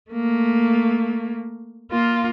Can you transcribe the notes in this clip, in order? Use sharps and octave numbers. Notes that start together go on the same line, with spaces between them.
A3 A#3
A#3 F4